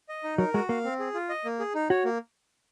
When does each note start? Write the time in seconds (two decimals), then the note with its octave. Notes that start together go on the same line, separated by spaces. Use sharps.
0.09 D#5
0.24 D#4
0.38 F#3 A#4
0.54 G#3 F#4
0.69 A#3 F5
0.84 C4
0.99 G#4
1.14 F4
1.29 D#5
1.45 A#3
1.60 G#4
1.75 D#4
1.90 F#4 C#5
2.05 A#3